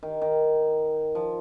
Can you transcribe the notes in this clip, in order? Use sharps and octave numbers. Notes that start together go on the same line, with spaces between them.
D#3
D#3
F3